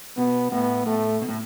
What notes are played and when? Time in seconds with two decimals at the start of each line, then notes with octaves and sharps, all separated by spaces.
0.17 B2 B3
0.52 A2 B3
0.86 A2 A3
1.22 B2
1.29 A2